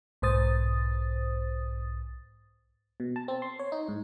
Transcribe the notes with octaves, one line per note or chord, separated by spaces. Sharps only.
B1 G#2 C5 D#6 A6
B2
A5
C4
C6
C#5
D#4
G#2